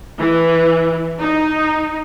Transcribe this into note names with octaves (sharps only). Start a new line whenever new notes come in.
E3
D#4